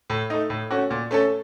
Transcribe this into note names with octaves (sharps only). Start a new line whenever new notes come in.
A2
A3 D#4
A2
A3 C#4 F#4
A#2
A3 C#4 A4